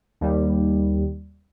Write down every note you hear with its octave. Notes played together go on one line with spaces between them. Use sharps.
D#2 G3